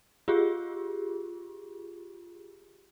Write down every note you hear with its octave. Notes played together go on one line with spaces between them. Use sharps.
F4 G4 G#4